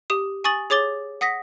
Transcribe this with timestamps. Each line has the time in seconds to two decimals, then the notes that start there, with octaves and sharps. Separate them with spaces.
0.10 G4 D#6
0.44 G#5 C#6 D#6 A6 F#7
0.70 G#4 C#5 D6 A6 G7
1.21 F#5 D#6 A#6 B6